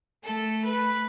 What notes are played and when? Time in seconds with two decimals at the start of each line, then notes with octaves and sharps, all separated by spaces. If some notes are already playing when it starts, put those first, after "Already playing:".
0.24 A3 A4
0.63 B4